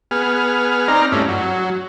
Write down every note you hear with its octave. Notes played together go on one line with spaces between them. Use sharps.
B3 G#4 F6
C4 D#4 D5 A#5 F6
G2 A3 C#4 E4
F#3